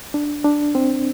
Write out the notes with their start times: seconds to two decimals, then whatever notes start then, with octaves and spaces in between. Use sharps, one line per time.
0.14 D4
0.45 D4
0.75 C4